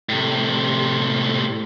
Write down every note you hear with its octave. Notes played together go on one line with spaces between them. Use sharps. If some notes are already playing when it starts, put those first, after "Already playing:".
A2 C3